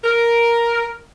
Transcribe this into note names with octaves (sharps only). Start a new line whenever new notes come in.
A#4